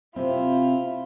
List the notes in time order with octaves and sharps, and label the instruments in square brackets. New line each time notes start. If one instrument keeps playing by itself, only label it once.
[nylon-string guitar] C3 C4 [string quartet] E4 F4